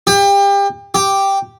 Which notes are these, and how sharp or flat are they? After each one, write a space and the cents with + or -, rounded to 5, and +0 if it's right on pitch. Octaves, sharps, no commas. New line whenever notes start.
G4 +30
G4 +0